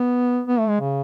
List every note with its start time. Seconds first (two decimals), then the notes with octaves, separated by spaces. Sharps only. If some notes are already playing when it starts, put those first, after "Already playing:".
Already playing: B3
0.47 B3
0.59 A3
0.68 G#3
0.80 C#3